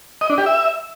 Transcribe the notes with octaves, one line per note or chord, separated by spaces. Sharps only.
D#5
D4
G4
E5